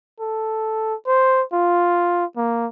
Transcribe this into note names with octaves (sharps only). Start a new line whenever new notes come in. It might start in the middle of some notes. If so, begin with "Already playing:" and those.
A4
C5
F4
A#3